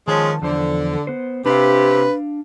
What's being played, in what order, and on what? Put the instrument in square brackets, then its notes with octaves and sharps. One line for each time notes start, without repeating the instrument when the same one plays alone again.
[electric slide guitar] D#3 A5 [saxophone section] F3 G#3 C#4
[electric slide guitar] E2 F3 C5 [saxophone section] D3
[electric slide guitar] B3 C5
[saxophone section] C3 G4 [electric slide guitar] D4 F5 [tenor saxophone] B4